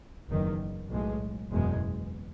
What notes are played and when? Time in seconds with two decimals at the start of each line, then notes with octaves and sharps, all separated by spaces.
0.28 F#1 E2 D#3
0.89 B1 A2 G#3
1.51 F#1 E2 B2 G#3